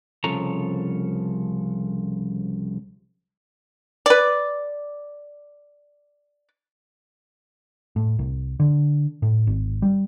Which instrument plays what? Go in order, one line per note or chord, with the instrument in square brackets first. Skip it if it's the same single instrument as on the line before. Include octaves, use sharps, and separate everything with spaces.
[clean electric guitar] C2 C#3 F3 A4 C#5 A#5
[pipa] B4 D5
[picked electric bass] A2
C2
D3
A2
G#1
G3